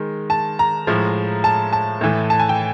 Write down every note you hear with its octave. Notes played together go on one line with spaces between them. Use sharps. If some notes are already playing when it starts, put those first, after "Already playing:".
Already playing: D#3 G#3
A5
A#5
A2 F3 G#3
A5
A5
A2 E3 A3
A5
G#5
G5